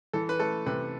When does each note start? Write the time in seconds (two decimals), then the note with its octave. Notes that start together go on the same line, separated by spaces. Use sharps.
0.13 E3 A4
0.29 B4
0.40 A3 A4
0.66 C3 B4